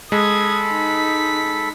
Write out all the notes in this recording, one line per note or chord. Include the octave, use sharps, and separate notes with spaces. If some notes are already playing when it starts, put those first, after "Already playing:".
G#3 A4 B5 D#6 G#6
D#4 B6